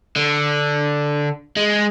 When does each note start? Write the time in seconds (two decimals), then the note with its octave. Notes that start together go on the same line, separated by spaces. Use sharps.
0.16 D3
1.56 G#3